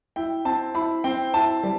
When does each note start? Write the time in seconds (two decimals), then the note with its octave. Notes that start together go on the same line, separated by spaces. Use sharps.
0.16 E4 G5
0.45 C4 A5
0.75 E4 B5
1.04 C4 G5
1.34 E4 A5
1.63 G3